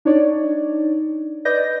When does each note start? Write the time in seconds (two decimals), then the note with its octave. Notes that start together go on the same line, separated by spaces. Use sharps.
0.05 D4 D#4 C#5 D5
1.45 B4 D5 D#5 G6 A#6